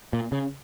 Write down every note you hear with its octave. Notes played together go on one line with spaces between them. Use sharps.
A#2
C#3